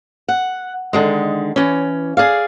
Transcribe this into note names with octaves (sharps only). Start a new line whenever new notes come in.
F#5
D3 D#3 G#3
E3 C#4
G#4 D5 F5